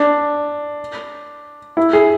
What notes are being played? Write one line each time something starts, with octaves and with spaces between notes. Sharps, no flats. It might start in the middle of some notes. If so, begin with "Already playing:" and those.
Already playing: D4
E4
G#4